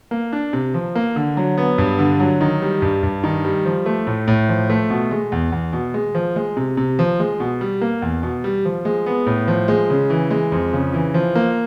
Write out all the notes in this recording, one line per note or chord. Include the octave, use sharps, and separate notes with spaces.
A#3
D4
C3
F3
A#3
D3
F#3
B3
G2
D3
F#3
D#3
G3
G2
G2
D#3
G3
F3
A3
A2
A2
F3
A3
B2
G#3
E2
E2
B2
G#3
F3
G#3
C3
C3
F3
G#3
B2
G3
A#3
E2
B2
G3
F3
G#3
B3
A2
F3
G#3
C#3
E3
G#3
F2
C#3
E3
F3
A#3